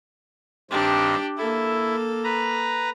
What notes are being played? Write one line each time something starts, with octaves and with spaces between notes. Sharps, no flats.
G2 D#3 C4 D4 G4
A#3 E4 A4
B4 A#5